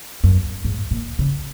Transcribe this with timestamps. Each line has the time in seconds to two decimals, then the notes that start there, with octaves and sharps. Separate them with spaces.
0.24 F#2
0.64 G#2
0.91 A#2
1.19 C#3